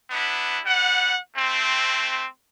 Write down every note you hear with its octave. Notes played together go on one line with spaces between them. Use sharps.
B3 D4 E4
G3 F#5
A3 C4